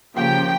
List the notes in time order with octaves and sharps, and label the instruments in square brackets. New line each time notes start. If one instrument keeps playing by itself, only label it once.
[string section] C#3 F3 A#3 G4 G5